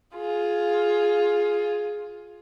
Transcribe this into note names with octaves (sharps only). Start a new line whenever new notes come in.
F4 G#4